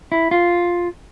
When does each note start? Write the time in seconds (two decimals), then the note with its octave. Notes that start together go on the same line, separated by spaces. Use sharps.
0.12 E4
0.31 F4